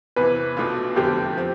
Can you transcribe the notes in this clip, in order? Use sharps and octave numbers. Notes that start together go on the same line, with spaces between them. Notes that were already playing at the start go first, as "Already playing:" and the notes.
E2 C3 E3 B4
B1 B2 A3 D4 F4
F1 E2 D3 F3 G4
F3 C4